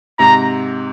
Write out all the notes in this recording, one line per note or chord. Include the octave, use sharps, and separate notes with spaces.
G#2 C3 A#5